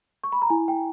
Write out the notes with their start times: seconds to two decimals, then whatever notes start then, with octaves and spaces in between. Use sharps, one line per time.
0.24 C#6
0.32 B5
0.42 A#5
0.50 E4 G#5
0.68 G5